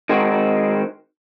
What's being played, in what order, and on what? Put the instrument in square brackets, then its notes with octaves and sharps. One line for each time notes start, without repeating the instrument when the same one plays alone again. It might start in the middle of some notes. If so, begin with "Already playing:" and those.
[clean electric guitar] D#3 G#3 C4 F#4